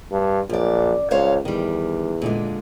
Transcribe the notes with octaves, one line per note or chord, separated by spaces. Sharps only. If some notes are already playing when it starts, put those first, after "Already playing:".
G2
A#1 F#2 D5
C#2 C5 C#5 F5
E2 D#3 G3
A#2 D3 G#3